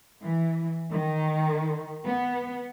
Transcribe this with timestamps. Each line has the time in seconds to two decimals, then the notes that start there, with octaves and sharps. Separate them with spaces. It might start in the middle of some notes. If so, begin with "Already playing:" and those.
0.22 E3
0.91 D#3
2.05 B3